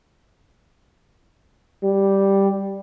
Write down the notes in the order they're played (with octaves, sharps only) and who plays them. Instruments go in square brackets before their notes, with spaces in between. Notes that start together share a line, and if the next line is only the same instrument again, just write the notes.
[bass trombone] G3